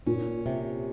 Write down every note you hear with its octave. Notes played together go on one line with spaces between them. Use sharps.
A#2 C#4
C3